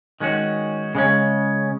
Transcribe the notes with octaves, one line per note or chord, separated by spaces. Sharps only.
D#3 G#3 C#4 F#4
C#3 G#3 C#4